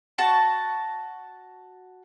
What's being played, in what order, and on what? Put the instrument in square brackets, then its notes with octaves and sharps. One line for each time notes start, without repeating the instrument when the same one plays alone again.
[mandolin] F#4 A5 C#6